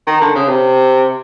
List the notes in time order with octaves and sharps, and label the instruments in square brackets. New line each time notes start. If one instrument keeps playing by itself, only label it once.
[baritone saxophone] D#3
D3
C#3
C3